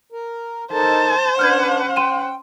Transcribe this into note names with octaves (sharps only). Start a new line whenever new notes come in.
A#4
D#4 A4 A#4 C5 A5
C#4 D4 B4 F#5 A5 F6 G6 G#6
G5 C6 D#7 E7